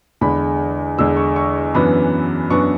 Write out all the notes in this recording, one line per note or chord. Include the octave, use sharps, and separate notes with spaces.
E2 D3 G#3 B5
E2 D3 G#3 E6
C#6
C#6
F#2 E3 B3 D4 B5
F#2 E3 B3 D4 C#6